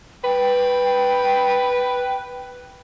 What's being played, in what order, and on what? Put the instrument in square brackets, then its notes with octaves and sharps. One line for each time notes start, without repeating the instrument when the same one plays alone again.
[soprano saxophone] B4 [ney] G5